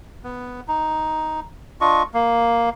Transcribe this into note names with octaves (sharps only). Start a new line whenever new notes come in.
B3
D#4
D4 F4 D#5 C#6
A#3